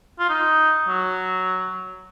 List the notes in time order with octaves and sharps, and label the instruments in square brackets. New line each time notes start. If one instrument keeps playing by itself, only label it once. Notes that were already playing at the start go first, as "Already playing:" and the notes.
[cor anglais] F4
D#4
F#3